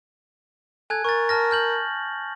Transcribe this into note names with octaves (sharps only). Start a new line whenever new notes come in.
A4 G#5 F#6 G#6
A#4 C#6 A6
A5 F6 A#6
F6 G6 F#7